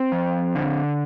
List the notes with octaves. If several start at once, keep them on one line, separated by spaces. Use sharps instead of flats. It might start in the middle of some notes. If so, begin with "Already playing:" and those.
Already playing: C4
F2
D3